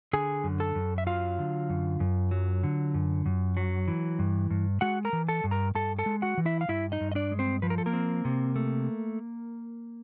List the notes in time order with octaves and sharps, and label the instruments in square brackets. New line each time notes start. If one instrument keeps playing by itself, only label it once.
[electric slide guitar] D3 G#4 G#5
F#2
A4 A5
F#2
E5
F#3 F4 F5
D3
F#2
F#2
F#3
D3
F#2
F#2
F#3
E3
G2
G2
G#3 F#4 F#5
A#4 A#5
E3
A4 A5
G2
A#4 A#5
G2 A4 A5
A4 A5
G#3
F#4 F#5
E3
E4 E5
F5
G2 E4 E5
D#4 D#5
G2
D#5
D4 D5
G#3
C4 C5
F3 B4
A#4
A4
A#3 A#4
C4
C3
A3